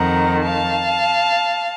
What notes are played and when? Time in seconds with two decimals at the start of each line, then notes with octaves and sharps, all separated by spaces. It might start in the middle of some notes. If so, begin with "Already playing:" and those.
Already playing: F2 D#3 F#5 A#5
0.42 F5 A5